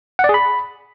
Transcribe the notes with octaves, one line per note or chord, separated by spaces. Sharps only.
F#5
D5
G#4
B5